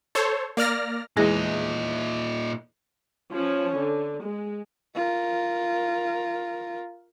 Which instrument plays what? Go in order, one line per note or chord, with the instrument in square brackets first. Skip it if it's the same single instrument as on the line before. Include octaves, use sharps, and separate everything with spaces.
[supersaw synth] A4 C5 C#5
A#3 D5 F6 A#6
[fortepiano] E2 G#3 [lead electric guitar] A#2 D#4 [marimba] E4 G#4 A#6
[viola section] F3 C#4 C#5
D3
G#3
[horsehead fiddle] F4 A#4